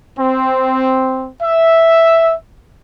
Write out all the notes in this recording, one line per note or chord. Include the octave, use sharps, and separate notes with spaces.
C4
E5